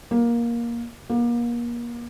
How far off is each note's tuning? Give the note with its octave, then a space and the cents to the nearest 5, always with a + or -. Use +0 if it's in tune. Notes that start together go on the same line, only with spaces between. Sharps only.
A#3 +15
A#3 +35